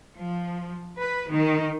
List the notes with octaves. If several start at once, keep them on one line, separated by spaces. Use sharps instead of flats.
F3
B4
D#3